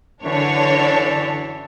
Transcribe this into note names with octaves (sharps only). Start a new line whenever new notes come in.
F#2 D3 E3 D4 C#5 A5